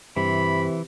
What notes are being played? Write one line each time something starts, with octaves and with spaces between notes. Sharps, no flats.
G2 C3 E3 B5